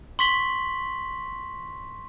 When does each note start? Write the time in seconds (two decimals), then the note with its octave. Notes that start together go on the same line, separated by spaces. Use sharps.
0.19 C6 C#6 B6 F#7 G7